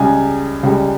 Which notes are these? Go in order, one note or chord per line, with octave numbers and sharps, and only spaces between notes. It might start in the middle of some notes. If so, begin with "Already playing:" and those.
Already playing: C#2 C#3 G3 G#5
C#2 C#3 G3